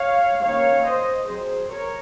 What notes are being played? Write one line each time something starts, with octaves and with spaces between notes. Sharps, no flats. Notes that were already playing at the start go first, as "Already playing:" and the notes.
Already playing: C#5 F5
D#3 A#3 C#4 C#5 F5
C5 D#5
F#3 C4 G#4 C5
A#4 C#5